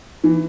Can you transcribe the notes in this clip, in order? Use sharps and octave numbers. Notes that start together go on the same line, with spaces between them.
E3